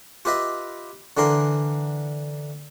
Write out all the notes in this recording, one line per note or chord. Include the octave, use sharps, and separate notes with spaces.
F4 G4 B4 D#5 E5
D3 E3 D4 A#4 C6